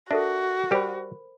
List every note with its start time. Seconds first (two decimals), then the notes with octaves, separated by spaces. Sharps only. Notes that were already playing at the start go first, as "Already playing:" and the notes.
0.11 D4 F#4 A4 A#4 E5
0.71 G3 G4 A#4 C5 B5